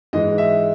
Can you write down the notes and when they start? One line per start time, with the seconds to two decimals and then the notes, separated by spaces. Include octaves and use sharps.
0.13 G#2 E3 G#3 D#5
0.38 E5